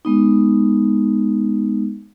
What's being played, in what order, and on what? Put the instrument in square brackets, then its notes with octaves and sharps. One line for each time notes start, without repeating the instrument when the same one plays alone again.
[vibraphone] G#3 B3 D#4